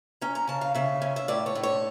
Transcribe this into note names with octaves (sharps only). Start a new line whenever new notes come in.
C#4 A#5
A#5
C#3 A5
F5
C#3 E5
C#4
E5
A2 D5
C#5
A2
C#5